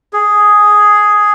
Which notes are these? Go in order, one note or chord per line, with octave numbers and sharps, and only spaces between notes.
G#4